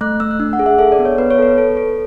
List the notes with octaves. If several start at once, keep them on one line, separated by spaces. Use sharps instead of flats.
A3 F#6
A3 E6
F#6
D4 E6
F#5
G#4
E5
A4 E5
D5
B3
C#5
B3 B4
C#5
A4 B4
A4
A4